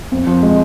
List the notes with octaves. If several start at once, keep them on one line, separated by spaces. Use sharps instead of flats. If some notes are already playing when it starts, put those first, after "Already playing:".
F2
F3
G#3